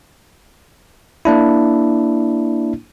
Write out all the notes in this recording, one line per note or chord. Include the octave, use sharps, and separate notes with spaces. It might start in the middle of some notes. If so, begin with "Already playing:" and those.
A#3 D4 E4